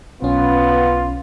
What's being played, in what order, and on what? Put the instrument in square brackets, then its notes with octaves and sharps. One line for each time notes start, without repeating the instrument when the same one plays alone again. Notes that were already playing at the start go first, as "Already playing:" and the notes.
[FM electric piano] B1 C#4 [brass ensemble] B3 [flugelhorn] F4